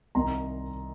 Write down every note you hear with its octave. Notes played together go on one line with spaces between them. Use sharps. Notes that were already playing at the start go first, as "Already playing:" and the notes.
C2 C3 D#3 A#5 C6